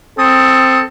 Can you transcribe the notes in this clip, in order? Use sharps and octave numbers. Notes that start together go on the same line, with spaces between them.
C4 A4 D#6